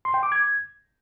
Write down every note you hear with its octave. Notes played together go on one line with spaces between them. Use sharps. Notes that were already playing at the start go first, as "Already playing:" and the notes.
C6
G5
D6
G#6